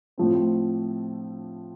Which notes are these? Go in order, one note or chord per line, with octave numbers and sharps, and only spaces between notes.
A2 F3 A3 C4